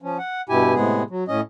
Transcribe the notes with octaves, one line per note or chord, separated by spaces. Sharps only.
F3 C#4
F#5
G2 B2 E4 G4 G#5
A2 C3 G#3 B3 G#4
F#3
A2 C#4 D#5